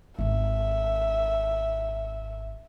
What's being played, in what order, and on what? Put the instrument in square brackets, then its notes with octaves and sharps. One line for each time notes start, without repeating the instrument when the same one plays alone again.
[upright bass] G#1 D#3 [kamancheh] E5